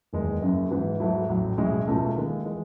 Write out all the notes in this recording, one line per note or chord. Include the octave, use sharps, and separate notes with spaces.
F#1 E2 D#3 G#3
F#1 F#2 C#3
G#2 E3 B3 E4
G#2 F#3 A3 E4
A1 A2 F#3
B1 A2 G#3 C#4 E4
C#2 B2 A3 C#4 E4
D#2 D#3 G#3
E3 G#3